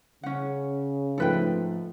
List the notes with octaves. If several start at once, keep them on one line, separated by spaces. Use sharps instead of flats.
C#3 C#4 F#5
G#2 F3 A3 A4 B4 G5